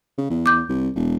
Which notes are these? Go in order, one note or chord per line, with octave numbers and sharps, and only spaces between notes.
C#3
E2
D6 G6
C2
E1